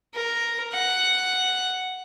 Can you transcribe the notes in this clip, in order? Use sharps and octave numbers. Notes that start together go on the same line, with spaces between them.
A#4
F#5